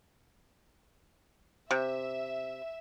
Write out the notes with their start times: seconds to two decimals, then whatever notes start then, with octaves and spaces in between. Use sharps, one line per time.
1.71 C3 E5